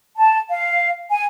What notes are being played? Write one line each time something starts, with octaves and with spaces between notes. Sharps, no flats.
A5
F5
G#5